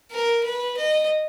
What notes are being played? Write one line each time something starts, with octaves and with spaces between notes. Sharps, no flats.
A#4
B4
D#5